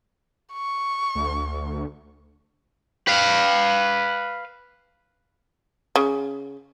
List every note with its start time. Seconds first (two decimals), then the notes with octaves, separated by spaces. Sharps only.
0.53 C#6
1.15 D2
3.08 B4 F5
5.96 C#3